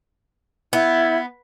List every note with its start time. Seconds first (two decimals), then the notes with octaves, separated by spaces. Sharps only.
0.73 B3 E4